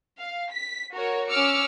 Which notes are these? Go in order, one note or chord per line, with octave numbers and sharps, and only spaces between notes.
F5
B6
F#4 A#4 C#5
C#4 D6 E6 F6 C#7